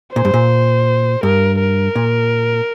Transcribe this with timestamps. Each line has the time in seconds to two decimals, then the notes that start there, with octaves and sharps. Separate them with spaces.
0.16 A#2 C5
0.25 G2
0.34 A#2
1.23 G2 A#4
1.60 A#4
1.96 A#2